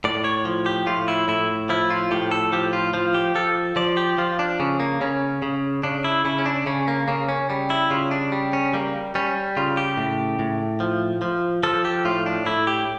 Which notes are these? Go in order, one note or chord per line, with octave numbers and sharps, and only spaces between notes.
A2 D5
C#5
F3
G4
A2 F4
E4
A2 E4
F3 E4
F4
A2 G4
A4
F3 G4
F4
F3 F4
G4
F3 A4
F3 D5
G4
F3 F4
D4
C#3 C#4
A#3
C#3 C#4
C#3
C#3 D4
E4
C#3 E4
C#4
D4
C#3 C#4
A#3
C#3 A#3
C#4
G3
E4
C#3 F4
D4
G3
C#4
G3 A#3
G3 C#4
C#3 F4
G4
A2
A2
F3
F3
F3 A4
G4
A2 F4
D4
A2 E4
G4